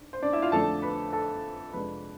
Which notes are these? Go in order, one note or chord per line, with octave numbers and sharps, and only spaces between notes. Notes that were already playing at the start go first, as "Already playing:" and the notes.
Already playing: G#2 D4
C5
D4 D5
E4 E5
F4 F5
F2 D3 A3 D4 A4 A5
B4 B5
A4 A5
F2 C3 G#3 D4 B4 B5